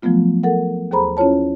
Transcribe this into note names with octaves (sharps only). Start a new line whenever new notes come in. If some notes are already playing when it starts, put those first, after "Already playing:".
F3 F#3 A3 B3 F4
A4 A#4 F#5
D#2 G#4 A4 C5 A#5 B5
C#4 E4 F4 C#5 A5